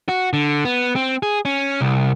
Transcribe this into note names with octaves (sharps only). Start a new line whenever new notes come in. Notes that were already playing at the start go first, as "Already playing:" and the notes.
F#4
D3
B3
C4
G#4
C#4
C2